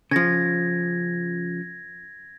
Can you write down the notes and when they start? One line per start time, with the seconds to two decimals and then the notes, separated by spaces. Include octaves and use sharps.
0.11 C#3 F3 G#6 A#6